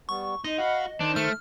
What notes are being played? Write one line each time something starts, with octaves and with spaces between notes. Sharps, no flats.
G3 B3 C#6
D#4 D#5 C6
F#4 F5 F#5 B5
D#3 D4 C5
A3 F6